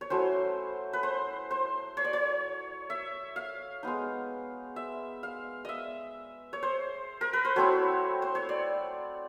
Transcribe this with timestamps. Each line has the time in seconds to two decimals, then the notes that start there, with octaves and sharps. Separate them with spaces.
0.01 C#5
0.10 F#3 A3 C#4 E4 C5
0.93 B4
1.03 C5
1.51 C5
1.97 C#5
2.04 D5
2.13 C#5
2.90 E5
3.36 F5
3.83 G#3 B3 D#4
4.76 E5
5.23 F5
5.65 D#5 E5
6.53 C#5
6.63 C5
7.21 A#4
7.33 B4
7.45 C5
7.56 F#3 A3 C4 E4 C#5
8.22 C5
8.35 C#5
8.49 D5